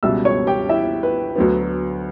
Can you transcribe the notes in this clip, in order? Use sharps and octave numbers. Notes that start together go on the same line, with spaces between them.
C#2 B2 G3 E5 E6
C#5 C#6
G4 G5
E4 E5
B4
D2 D3 F#3 B3